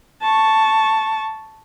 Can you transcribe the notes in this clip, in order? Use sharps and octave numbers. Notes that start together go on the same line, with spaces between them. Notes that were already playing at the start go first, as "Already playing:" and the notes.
A5 C#6